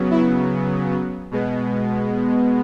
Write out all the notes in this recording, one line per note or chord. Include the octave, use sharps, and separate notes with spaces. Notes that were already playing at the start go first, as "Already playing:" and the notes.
Already playing: C#3 F#3 B3
E4
B2 G#3 B3